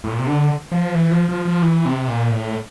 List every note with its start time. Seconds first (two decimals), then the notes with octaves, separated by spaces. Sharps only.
0.04 A2
0.11 A#2
0.19 C3
0.26 D3
0.72 F3
0.95 E3
1.11 F3
1.29 F3
1.45 F3
1.62 E3
1.85 C3
2.08 A#2
2.31 A2